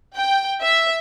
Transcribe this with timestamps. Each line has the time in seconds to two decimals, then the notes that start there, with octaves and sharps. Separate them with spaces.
0.16 G5
0.62 E5